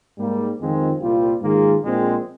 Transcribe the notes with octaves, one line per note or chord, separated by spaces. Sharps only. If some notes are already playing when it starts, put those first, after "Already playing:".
G#2 G3 A#3
F2 D#3 G#3 C4 F4
C2 A#2 G3 C4 F4
G#2 D#3 A#3 F4 G#4
A#1 A#2 G#3 C4